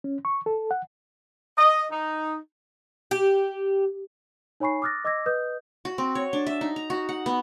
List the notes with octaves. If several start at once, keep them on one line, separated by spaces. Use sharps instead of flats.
C#4
C#6
A4
F#5
D#5
D#4
G4
D#4 C#5 G#5 B5 C#6 C7
D6 D#6 F6 F#6 A6 A#6
D#5 D6 E6 G#6 A#6
B4 D#5 D#6 G6
F#4
C4
C#5
D4
E5
D#4
A#5
F#4
F#5
B3